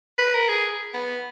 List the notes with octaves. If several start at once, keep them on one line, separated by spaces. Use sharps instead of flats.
B4
A#4
G#4
B3